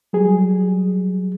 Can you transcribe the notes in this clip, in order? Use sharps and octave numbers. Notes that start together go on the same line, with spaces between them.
F#3 G3 G#4